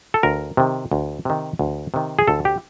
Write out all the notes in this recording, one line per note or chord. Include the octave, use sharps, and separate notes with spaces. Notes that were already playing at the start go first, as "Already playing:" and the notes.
A4
D2 A#4
C3 D#3
D2
C3 D#3
D2
C3 D#3
G#4
D2 A4
G4